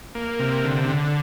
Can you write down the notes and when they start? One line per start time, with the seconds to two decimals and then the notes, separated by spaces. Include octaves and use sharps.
0.15 A#3
0.39 C3
0.64 D3
0.89 D3